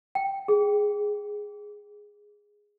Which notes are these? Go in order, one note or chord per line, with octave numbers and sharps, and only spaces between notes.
G5
G#4